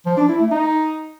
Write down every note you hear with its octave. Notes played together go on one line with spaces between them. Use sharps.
F3
D4
E4
A3
D#4